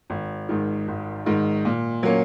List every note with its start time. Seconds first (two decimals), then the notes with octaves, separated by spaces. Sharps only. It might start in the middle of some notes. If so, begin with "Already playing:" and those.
0.10 G#1
0.49 G#2 D#3
0.88 G#1
1.26 G#2 D#3
1.65 A#2
2.03 F#3 A#3 C#4